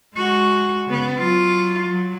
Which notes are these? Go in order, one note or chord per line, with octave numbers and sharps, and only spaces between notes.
G#3 F#4
C#3 B3
F#3 F4
F#3